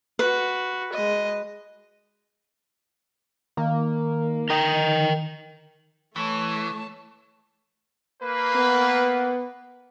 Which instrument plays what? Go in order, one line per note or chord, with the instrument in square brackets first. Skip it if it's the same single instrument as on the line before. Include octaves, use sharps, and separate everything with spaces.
[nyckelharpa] F#4 [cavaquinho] B4
[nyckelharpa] G#3 D#5
[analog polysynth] D#3 [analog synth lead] A#3
[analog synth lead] D#4 [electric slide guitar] A#4 G5
[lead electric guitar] E3 [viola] A3 [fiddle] C#5 A5 [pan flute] C#6
[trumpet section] A#3 B4
[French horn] B3